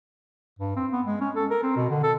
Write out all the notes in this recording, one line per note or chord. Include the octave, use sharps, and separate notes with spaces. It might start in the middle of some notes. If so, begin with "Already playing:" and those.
G2
C4
B3
G#3
C#4
A4
A#4
C4
B2
D3
A4